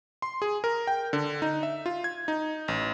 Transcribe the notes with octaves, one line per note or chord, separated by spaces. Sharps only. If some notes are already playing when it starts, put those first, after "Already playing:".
C6
G#4
A#4
G5
D3
D#4
E5
F4
G#6
D#4
A1